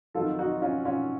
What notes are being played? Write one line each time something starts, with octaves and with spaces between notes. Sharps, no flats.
F2 D#3 F#3 F4 A4
D#4 F#4
C#4 F4
C#4 F4